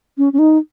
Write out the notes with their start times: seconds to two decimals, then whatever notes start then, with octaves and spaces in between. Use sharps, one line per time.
0.18 C#4
0.33 C#4
0.39 D#4